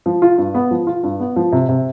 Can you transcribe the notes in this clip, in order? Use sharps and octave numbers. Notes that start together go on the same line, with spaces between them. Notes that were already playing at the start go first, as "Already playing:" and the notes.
F3
F4
G2
B3
F3
F4
G2
B3
F3
C3
C3